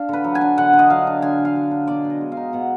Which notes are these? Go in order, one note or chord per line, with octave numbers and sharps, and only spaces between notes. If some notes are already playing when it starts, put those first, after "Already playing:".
Already playing: D4 F5
D3 B4
F#3
G#5
D4
D3 F#5
D3
D#5
F#3 F5
D4
D3 G#5
D3
F5
F#3
D4
B2 D5
B2
D#5
G#3
F5
D#4
B2 F#5